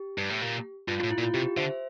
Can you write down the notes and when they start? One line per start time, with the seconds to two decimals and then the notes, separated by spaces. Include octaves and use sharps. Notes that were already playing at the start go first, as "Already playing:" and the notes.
Already playing: G4
0.18 G2
0.30 A2
0.42 A#2
0.88 G2 F4
1.00 A2 F4
1.11 E4
1.18 A#2
1.23 F4
1.34 C3 G4
1.57 D3 C5 E5